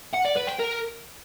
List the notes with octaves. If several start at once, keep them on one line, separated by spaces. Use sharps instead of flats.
F#5
D5
B4
G5
A#4